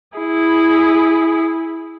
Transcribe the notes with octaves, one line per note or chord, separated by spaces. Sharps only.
E4 G#4